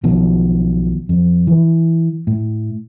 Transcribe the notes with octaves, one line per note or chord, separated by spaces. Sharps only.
B1 B2 D#3 F3
F2
E3
A2